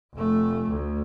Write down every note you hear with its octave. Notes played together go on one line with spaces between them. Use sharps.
F1 A3
D2